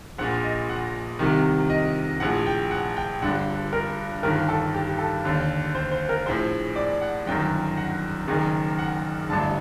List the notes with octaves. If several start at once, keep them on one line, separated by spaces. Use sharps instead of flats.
A#1 A#2 F#5
D#5
F#5
C2 C3 D#3
D#5
A#1 A2 F#5
G5
F#5
G5
G1 G2 D3 F#5
A#4
G1 G2 D#3 A#4
A4
G4
A4
D#2 D3
C5
C5
A#4
A#1 A2 C5
D5
F#5
G1 F#2 D#3 G5
F#5
F#1 F#2 D#3
F#5
A1 G2 D3 A5